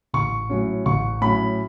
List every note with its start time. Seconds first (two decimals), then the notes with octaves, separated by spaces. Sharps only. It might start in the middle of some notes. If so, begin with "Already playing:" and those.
0.13 A1 C#6
0.49 A2 F#3 C#4
0.86 A1 C#6
1.21 A2 F#3 C#4 B5